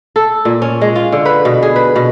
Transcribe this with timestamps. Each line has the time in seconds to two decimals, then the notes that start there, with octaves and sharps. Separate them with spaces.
0.16 A4
0.45 A#2
0.62 C#4
0.81 G#3
0.96 F4
1.12 D3
1.26 B4
1.45 B2
1.63 G#4
1.76 B4
1.96 B2